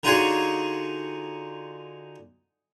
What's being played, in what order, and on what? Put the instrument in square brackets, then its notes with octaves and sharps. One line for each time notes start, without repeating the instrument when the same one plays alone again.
[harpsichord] D3 D#4 F4 F#4 G#4 C#5